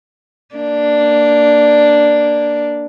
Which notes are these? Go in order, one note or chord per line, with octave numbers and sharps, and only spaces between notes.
A#3 D4